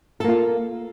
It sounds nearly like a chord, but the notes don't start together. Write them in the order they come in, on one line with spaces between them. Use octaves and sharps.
A4 A#3 F4